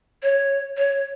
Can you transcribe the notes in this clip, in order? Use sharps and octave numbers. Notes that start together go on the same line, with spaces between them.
C#5
C#5